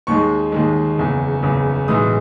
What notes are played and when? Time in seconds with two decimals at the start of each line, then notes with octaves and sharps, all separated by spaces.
0.07 D#2 D#3 G#3 C#6
0.52 D#2 D#3 G#3
0.98 F#1 E2 C#3
1.43 F#1 E2 C#3
1.88 B1 A2 E3 G#3 D#6